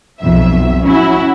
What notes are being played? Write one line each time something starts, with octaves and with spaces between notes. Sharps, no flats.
B1 F2 E5
C#4 E4 F#4